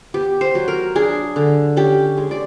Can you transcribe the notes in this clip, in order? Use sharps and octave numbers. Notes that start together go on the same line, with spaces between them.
B3 G4
C5
F#3
A#4
D4 G#4
D3
C#4 G4
G#3
D5